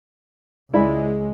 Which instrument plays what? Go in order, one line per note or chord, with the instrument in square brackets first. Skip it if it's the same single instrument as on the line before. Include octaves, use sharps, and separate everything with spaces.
[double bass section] C#2 G#3 [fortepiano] E4 D5 B5